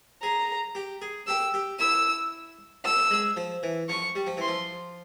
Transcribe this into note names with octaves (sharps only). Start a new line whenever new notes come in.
G#4 A#5
G4
G#4
G4 E6
G4
E4 E6
F4 E6
G#3
F3
E3
F3 C#6
G3
F3
E3 C6
F3